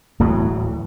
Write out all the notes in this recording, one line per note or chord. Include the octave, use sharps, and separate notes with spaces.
D1 A2 E3 F#3